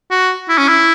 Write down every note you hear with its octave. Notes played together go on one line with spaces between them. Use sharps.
F#4
E4
C#4
E4